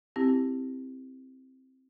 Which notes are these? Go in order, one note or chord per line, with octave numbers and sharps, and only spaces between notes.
C4 E4 G4